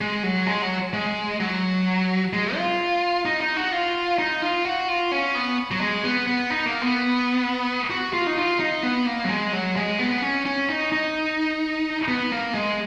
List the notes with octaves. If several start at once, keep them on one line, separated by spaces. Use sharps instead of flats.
G#3
F#3
G#3
F#3
G#3
F#3
G#3
F4
D#4
D#4
F#4
F4
D#4
F4
F#4
F4
C#4
B3
F#3
G#3
B3
B3
D#4
A#3
B3
F#4
F4
D#4
F4
D#4
B3
A#3
F#3
G#3
F#3
G#3
B3
C#4
C#4
D#4
D#4
B3
A#3
G#3